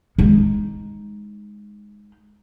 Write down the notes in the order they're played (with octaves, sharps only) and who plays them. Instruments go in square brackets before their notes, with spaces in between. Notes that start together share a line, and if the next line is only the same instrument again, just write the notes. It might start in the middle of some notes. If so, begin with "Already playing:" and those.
[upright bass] G#3 D#4